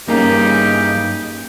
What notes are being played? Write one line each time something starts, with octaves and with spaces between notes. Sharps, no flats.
G2 C#3 E3 A#3 C#4 D#4 G4 A#5